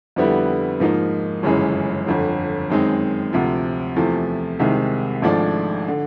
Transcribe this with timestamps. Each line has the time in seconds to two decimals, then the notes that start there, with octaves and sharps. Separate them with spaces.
0.16 F2 D3 G3 B3 E4
0.80 G#2 F3 A#3 D#4
1.43 G1 F#2 C#3 E3 G#3
2.07 G1 F2 D3
2.70 F#2 D#3 G#3 C4 D#4
3.33 D2 C3 F3
3.96 E2 C3 F3 A3
4.59 C2 C3 D#3 G#3
5.22 G#1 G#2 F3 A3 D4
5.88 D3